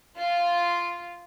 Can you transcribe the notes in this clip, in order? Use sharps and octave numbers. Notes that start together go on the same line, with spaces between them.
F4